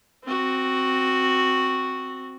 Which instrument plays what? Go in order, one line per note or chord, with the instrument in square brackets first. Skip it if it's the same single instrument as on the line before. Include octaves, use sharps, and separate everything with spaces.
[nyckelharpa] C4 F#4